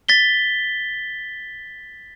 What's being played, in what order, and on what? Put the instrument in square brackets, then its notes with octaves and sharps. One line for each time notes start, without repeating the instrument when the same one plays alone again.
[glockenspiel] A6 B6 G7